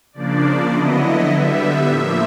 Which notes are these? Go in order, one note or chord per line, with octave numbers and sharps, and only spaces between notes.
C#3 F3 A#3 D4 D5
D3 F#3 B3 E4 D#5
D3 G3 B3 E5
A2 F3 A#3 E5